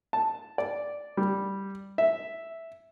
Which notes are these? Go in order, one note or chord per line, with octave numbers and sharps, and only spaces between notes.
A5
D5
G3
E5